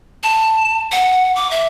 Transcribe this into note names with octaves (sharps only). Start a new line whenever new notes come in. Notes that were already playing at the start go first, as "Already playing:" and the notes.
A5
F#5
D6
E5